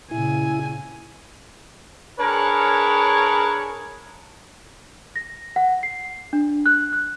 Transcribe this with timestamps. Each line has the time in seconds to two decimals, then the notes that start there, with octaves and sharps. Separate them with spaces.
0.11 A#2 C#3 E4 G#5
2.19 D4 G#4 A#4 B4 C#5
5.16 A#6
5.56 F#5
5.83 C7
6.33 D4
6.66 F#6
6.93 F#6